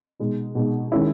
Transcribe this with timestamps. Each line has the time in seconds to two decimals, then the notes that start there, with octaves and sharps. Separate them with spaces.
0.19 B2 G#3 D#4
0.55 B2 G#3 D#4
0.92 D#3 G#3 C#4 E4